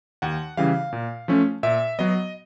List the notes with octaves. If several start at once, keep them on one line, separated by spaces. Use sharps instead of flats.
D#2 F#5
C#3 E3 G3 F5
A#2
F3 A3 C#4
A#2 E5
F#3 B3 D#5